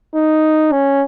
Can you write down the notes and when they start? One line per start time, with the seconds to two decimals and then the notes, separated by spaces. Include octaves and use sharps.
0.14 D#4
0.72 C#4